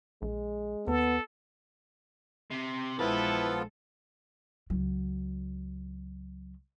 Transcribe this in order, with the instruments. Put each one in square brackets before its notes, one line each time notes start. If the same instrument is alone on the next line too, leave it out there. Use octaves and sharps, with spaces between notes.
[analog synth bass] A#1 [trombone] G#3
[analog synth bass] D#2 [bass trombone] B3 [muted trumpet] A4
[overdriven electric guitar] C3
[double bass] A#1 G#3 [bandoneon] F3 B3 F4 [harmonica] E4 B4 [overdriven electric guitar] A4
[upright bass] C#2 F#3